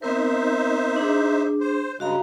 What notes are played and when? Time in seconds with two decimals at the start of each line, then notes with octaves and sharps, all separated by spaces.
0.02 B3 C4 D#4 A#4 C5 E5
0.96 D4 G#4
1.60 C5
2.00 G2 C#3 G#3 F#4 F5 A#5